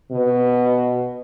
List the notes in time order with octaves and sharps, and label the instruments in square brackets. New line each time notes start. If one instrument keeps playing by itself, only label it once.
[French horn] B2